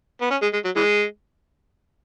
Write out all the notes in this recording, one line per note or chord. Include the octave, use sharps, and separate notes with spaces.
B3
C#4
G#3
G#3
F#3
E3 G#3